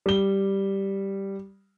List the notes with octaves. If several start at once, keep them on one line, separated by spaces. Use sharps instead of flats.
G3 G7